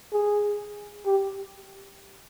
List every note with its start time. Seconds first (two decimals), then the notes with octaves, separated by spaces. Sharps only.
0.12 G#4
1.06 G4